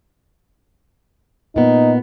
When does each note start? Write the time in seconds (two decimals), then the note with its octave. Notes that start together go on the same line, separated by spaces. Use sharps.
1.56 A#2 B3 D#4